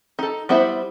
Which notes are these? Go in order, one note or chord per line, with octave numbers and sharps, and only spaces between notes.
D#4 A4
G3 B3 E4 C5 E5